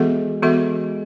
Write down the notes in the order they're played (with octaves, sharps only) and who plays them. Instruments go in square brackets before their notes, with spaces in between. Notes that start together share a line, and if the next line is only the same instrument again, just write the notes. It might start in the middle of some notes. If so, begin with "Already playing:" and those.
Already playing: [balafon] E3 B3 F#4 A4 E5 [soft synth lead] G#3
[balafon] E3 B3 F#4 A4 E5